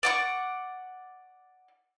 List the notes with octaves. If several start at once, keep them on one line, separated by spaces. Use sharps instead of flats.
D5 F#5 C#6